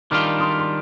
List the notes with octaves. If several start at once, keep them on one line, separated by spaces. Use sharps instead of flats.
D#3 G3 D4 F4 D6 F6
C6 D#6
C6